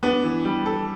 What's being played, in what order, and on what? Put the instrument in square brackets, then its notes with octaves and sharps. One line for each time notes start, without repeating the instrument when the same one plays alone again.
[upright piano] B3 [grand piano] D4
[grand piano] E3
G3
A4